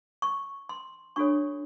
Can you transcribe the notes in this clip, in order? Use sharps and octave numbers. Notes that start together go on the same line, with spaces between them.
C#6
C6
D4 F#4 A4 C#5 C#6